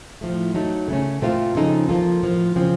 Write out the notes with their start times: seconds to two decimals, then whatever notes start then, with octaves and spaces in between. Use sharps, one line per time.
0.21 A2 F3 A3
0.54 F#3 A3 D#4 A4
0.88 C#3 A3 C#4
1.22 A#2 A3 C4 F4
1.55 C#3 F3 C4 D#4 A4
1.89 F3 A#3 F4 A4
2.22 A2 F3 A#3
2.55 C#3 F3 C4